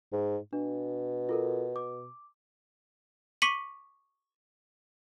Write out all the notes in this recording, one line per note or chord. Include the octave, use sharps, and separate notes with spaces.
G#2
B2 D4
F4 A4 A#4
D6
C#6 D6 B6 C#7 D#7 F#7